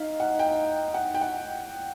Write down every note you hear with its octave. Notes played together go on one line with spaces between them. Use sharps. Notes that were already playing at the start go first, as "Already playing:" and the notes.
Already playing: D#4 F5
F#5
G5
F#5
G5
F#5